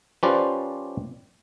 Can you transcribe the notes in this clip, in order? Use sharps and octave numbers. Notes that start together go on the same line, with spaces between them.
F3 C#4 G4 B4 C5 D5